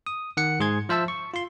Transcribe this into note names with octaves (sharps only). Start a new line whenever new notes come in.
D#6
D#3 F#5 C#7
G#2 G#4 C6 G#6
F3 C5 E5 A5 E6
C#6
F4 C6